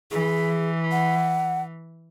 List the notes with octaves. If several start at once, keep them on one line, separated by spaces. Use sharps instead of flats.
E3 G#4
F#5